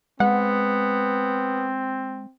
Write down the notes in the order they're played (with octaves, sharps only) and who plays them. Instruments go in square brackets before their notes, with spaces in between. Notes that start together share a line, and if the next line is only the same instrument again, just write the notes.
[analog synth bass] G#3 [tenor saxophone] B3 [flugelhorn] C4 [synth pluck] F#5